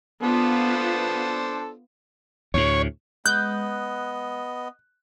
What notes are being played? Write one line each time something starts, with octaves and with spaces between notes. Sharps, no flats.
B3 D4 F4 A4 C5
D2 A2 C#5
G#3 B3 D#5 F#6 G6